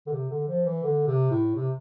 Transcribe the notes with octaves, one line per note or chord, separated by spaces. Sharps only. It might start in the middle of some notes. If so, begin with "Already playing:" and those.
D3
C3
D3
F3
E3
D3
C3
A2
C3